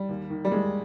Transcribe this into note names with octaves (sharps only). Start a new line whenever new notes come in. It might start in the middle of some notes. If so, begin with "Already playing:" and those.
Already playing: G3
D#2
D#3
G3
D#2 G#3